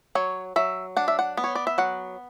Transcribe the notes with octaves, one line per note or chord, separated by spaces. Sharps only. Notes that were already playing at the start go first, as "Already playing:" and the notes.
F#3 C#5
F#3 E5
D4 F#5
E5
F#5
B3
C#5
D5
E5
F#3 F#5